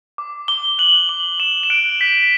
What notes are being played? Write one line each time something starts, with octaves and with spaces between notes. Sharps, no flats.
D6
D6 G7
F#6 F#7
D6 F#7
D6 E7
E7
F#6 D7
G6 B6